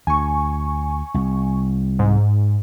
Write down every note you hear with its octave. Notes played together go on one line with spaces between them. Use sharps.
D2 G#5 C#6
C2
G#2